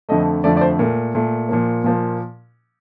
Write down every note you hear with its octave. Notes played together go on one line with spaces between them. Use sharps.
F2 D3 F3 A3 D#5
F2 D3 F3 A3 D5
D5
C5
A#2 A3 A#4
A#2 A3
A#2 F3 A#3
A#2 F3 A#3